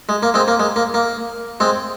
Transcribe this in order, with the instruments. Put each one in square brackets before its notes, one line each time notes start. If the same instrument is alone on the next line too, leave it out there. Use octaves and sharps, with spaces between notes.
[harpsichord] G#3
A#3
G#3 C4
A#3
G#3
A#3
A#3
G#3 C4